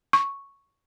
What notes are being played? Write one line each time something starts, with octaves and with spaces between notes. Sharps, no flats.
C#6